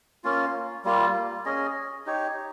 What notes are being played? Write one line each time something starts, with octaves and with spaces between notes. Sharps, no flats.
A#3 C#4 F4
G3 A#3 F4
C#4 G#4 D#5
D#4 G4 C#5